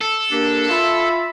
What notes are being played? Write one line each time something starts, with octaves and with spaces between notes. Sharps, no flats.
A4
A#3 D4 G4
F4 E5 B5